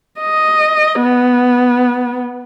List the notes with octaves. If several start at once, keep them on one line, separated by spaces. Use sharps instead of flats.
D#5
B3